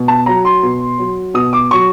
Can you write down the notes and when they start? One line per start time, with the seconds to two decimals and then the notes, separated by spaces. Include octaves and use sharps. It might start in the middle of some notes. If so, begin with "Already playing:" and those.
Already playing: B2
0.08 A5
0.26 F#3 A#5
0.45 C6
0.63 B2
0.98 F#3
1.34 B2 D#6
1.53 D6
1.71 F#3 C#6